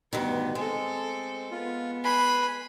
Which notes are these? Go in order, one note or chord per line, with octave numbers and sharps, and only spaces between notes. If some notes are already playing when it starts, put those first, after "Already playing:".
D2 G2 D#3 B3
G#3 C4 A4
B3 F4
B4 G#5 B5 C6